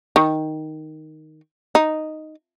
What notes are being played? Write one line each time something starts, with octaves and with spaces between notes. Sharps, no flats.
D#3
D#4